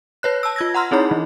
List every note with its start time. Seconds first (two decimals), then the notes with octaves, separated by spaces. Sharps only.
0.23 B4 C#5 F#6
0.43 A5 E6
0.56 F4 G#6 A#6
0.74 F#5 A#5 C6 F6
0.91 C4 D#4 E4 G#4 C#5 B5
1.11 E3